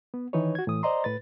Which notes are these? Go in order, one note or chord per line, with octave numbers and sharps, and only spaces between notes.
B3
D#3 E3 D#4 B4 C#5
F#4 G#6
A2 E3 D#6
C5 D5 D#5 A#5 C6
A2 B4 A6